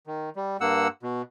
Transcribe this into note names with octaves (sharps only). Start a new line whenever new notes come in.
D#3
G3
G2 A#3 F#5 E6
B2